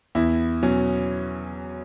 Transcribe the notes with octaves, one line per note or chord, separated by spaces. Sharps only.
E2 E4
B2 F#3 C#4